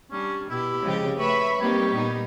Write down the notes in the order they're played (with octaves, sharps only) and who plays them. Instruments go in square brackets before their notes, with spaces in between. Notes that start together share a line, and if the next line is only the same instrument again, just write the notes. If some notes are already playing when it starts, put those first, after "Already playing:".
[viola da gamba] G3 D4 [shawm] C#4
[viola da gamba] B2 G4 [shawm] E4
[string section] C#3 F3 G4 [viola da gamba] G#3
[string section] A3 E5 B5 [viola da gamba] B4 C#5 [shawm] C#6
[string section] G3 G4 [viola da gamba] A#3 C4 D#4 [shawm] C#5
[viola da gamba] A#2 B3 D#4